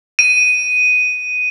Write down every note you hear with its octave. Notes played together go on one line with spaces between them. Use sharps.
D#7